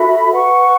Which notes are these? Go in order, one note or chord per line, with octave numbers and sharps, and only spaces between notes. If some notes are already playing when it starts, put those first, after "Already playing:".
Already playing: F#4 A4 E5 B5
B4 F#5 C#6